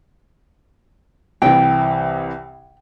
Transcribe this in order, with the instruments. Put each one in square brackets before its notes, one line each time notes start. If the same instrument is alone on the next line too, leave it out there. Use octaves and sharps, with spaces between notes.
[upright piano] C2 C3 E3 [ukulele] G5